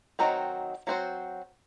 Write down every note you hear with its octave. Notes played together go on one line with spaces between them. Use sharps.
D#3 F#3 C4 D#4 F#4
F#3 C4 F#4 C5